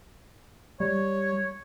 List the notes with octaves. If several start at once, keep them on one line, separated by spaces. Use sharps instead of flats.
G3 C#5